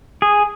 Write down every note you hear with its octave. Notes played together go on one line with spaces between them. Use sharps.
G#4